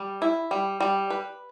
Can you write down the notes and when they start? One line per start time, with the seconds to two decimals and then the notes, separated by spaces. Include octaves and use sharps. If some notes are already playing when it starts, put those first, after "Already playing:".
Already playing: G3
0.22 E4
0.51 G3
0.80 G3
1.10 B4